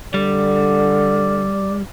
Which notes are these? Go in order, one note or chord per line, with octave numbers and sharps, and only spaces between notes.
D3 G3 D5